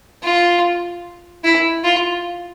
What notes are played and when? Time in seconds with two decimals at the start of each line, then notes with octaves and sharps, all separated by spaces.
0.23 F4
1.44 E4
1.84 F4